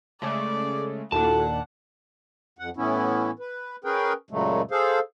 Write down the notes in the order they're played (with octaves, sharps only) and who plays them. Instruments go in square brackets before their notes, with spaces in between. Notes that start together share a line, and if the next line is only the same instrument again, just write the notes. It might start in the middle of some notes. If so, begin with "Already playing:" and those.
[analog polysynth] C#3 G#3 A3 [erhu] D5
[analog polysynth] D#2 A#2 D4 [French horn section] E4 F#4 A4 [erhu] F#5 [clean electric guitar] A5
[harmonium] F2 F#5
A2 E3 B3 C#4 E4
B4
C#4 G#4 A#4 B4 G5
F#2 A#2 C#3 F#3 G#3 A3
G#4 A4 C5 F5